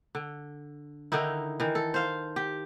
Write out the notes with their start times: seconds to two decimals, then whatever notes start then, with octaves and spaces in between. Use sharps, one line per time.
0.15 D3
1.12 D3 D#3 D#4 E4
1.60 D#3 E3
1.75 A4
1.94 C5 F5
2.36 G4